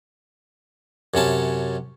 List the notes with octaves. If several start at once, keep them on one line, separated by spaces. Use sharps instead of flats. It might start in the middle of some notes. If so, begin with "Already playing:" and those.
F#2 C3 C#4 A5